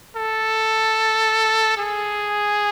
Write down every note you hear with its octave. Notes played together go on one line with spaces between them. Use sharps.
A4
G#4